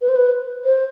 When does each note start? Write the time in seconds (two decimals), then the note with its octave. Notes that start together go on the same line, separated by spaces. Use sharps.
0.02 B4
0.09 C5
0.16 B4
0.65 C5